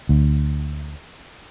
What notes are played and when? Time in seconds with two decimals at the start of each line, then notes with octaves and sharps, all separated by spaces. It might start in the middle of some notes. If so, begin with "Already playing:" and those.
0.09 D2